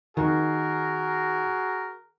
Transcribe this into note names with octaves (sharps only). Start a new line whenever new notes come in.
D#3 F#4 G#4 A#4